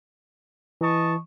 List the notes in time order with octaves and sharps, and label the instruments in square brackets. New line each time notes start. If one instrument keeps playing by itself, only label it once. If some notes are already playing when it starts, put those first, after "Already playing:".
[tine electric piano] E3 [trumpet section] D#5 A5 C#6